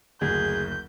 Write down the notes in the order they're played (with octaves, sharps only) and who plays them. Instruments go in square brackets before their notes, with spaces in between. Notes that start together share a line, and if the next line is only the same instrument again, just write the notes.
[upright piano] F#1 D2 [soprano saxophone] G#4 [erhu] G6